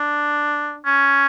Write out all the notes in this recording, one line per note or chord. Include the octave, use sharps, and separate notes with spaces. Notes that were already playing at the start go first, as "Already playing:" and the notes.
Already playing: D4
C#4